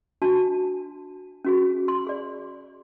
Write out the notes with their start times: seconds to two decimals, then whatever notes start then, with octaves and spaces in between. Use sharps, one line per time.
0.22 D4 F#4 A5
1.44 C#4 F#4 G#4
1.88 C6
2.07 G#4 D5